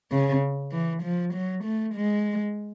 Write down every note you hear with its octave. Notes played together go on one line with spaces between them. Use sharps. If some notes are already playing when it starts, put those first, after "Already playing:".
C#3
E3
F3
F#3
A3
G#3